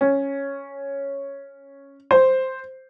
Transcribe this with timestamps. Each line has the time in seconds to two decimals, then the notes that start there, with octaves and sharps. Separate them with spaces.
0.01 C#4
2.11 C5